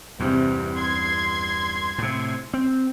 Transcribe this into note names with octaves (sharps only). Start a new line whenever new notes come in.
E2 G2 C3
C6 G#6
A2 C3
C4